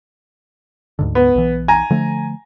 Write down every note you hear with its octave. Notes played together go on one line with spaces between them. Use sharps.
D2 G#2 D3
B3
B1 E3
G#5 A#5
D3 F3 A3